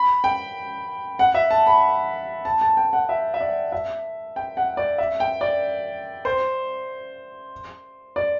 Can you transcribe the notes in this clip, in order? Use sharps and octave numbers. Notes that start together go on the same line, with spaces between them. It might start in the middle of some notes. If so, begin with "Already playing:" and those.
Already playing: B5
G5
F#5
E5
A5
B5
A5
A5
G5
F#5
E5
E5
D5
E5
G5
F#5
D5
E5
G5
D5
C5
D5